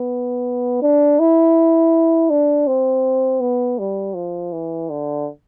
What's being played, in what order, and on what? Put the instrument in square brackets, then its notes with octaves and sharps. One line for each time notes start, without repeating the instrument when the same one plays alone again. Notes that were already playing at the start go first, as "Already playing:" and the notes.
Already playing: [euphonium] B3
D4
E4
D4
C4
B3
G3
F3
E3
D3